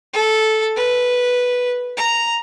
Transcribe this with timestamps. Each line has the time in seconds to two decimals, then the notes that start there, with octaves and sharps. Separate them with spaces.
0.13 A4
0.76 B4
1.97 A#5